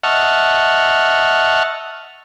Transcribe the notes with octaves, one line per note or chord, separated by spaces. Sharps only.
D#5 E5 F#5 A5 C#6 F6